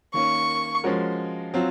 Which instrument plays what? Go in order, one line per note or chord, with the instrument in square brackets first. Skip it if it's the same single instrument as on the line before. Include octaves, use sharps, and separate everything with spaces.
[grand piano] D#3 A#3 C#4 [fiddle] C#6
[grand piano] F3 G#3 C#4 F#4 A#4
F#3 C4 F4